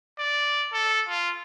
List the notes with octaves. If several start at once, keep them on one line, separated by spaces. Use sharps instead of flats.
D5
A4
F4